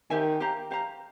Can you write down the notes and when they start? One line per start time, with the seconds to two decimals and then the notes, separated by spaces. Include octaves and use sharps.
0.10 D#3 G4 C5 E5 G#5
0.40 G4 C5 F5 A#5
0.71 G4 C5 F5 A#5